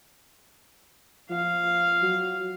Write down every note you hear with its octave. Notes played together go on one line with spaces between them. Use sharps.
F3 F5
F#3